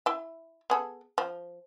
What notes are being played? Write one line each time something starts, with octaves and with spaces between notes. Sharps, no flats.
E4 E5
B3 G#4 A4
F3